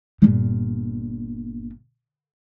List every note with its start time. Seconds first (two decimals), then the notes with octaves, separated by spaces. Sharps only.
0.22 G1 A#2